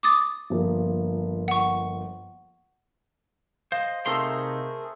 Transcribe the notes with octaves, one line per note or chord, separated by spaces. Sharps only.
D6 D#6 A6
G1 F3 A#3
F#5 C#6
C5 D#5 F5
C3 A3 D#4 G#4 A#4 C5 C6 E6